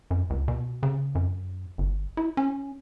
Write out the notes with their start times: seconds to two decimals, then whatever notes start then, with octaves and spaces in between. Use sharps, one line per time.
0.11 F#2
0.30 C#2
0.48 B2
0.83 C#3
1.15 F#2
1.78 G1
2.17 E4
2.37 C#4